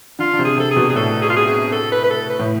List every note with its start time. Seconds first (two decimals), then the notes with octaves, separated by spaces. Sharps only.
0.19 D3 F4
0.33 D3
0.39 C3
0.45 G#4
0.57 C3 A4
0.71 G#4
0.76 B2
0.89 G#4
0.95 A2 A4
1.21 G#4
1.29 F4
1.37 G#4
1.47 G#4
1.72 A4
1.92 B4
2.04 B4
2.10 A4
2.30 B4
2.39 A2